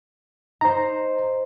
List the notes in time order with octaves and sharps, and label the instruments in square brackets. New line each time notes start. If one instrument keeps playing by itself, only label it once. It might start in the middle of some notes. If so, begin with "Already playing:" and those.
[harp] D#4 C5 [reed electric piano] A#5